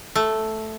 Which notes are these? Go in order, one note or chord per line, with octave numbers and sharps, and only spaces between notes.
A3